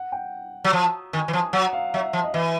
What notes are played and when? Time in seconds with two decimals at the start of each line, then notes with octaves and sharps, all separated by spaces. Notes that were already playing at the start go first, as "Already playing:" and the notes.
Already playing: F#5
0.12 G5
0.64 F#3
0.73 F3
1.13 D#3 G#5
1.28 E3
1.33 F3
1.53 F#3 F#5
1.73 F5
1.94 F#3 E5
2.13 F3
2.24 D#5
2.34 E3 E5